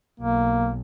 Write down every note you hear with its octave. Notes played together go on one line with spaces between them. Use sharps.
B1 A#3